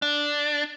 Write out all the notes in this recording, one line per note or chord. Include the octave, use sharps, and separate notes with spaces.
D4